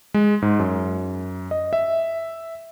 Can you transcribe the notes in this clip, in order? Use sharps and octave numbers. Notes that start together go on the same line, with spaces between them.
G#3
G#2
F#2
D#5
E5